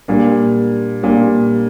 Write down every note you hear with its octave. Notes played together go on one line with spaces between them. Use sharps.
A#2 G3 D4
A#2 G3 D4